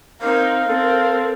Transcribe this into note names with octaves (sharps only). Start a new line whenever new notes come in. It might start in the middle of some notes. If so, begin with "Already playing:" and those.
C4 D#4 A#4 F5
C4 A4